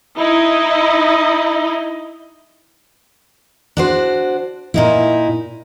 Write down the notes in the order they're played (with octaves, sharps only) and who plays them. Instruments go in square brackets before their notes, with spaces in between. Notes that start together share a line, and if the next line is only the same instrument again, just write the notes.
[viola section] D#4 E4 D#5
[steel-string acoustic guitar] D4 F#4 C5
A#2 D#4 E4